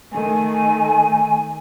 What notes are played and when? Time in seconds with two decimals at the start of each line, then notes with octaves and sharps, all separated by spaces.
0.13 D#3 A3 G#5